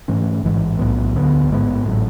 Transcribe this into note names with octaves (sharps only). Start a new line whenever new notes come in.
G#2 E3 A3 C#4
A1 G#2 E3 G#3
B1 A2 F#3 B3
D2 D3 G#3 B3
A1 G#2 G#3 B3
A1 A2 F#3